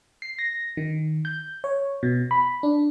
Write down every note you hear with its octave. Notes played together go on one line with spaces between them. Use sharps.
C7
A#6
D#3
G6
C#5
B2
B5
D4